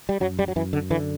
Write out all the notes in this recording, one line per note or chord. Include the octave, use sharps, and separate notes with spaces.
G3
F#2 F#3
G3
F#3
F#2 E3
D3
D3 E3